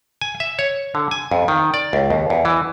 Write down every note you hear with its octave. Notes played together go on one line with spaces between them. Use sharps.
G#5
E5
C#5
D3
G#5
F2
D#3
D5
C#2
D#2
E2
E3